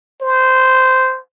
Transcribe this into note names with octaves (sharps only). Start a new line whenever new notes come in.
C5